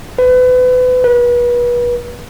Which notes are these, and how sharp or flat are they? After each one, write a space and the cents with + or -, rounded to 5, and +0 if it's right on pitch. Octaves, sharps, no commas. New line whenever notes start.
B4 +30
B4 -35